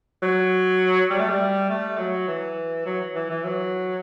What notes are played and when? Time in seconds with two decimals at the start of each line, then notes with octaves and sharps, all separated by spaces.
0.22 F#3
1.10 G3
1.19 A3
1.29 G3
1.69 A3
1.98 F#3
2.28 E3
2.86 F#3
3.15 E3
3.30 E3
3.45 F#3